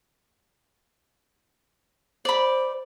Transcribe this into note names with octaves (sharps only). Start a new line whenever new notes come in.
C5 D5 B5